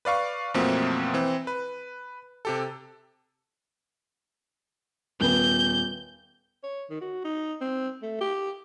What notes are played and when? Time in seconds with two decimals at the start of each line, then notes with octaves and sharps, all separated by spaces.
0.05 B4 D5 F5 C#6
0.54 F#2 B2 F3 A3 A#3 C4
1.14 E3 C4
1.47 B4
2.45 C3 G4 A4
5.21 D#1 B3 G6
6.63 C#5
6.90 D#3
7.01 F#4
7.24 D#4
7.61 C4
8.02 A3
8.21 G4